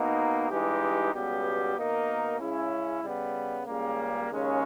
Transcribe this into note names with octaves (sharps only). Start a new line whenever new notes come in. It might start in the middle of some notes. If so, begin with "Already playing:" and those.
Already playing: B2 A#3 D#4
G2 E3 G#3 D#4 G4
C#2 B2 G3 B3 G4
B2 A#3 D#4 A#4
C#3 G#3 C#4 E4
C#3 G3 B3
C#2 C#3 G3 A#3
D#2 C#3 G#3 C#4